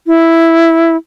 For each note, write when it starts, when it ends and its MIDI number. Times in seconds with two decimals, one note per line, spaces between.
0.07 0.96 64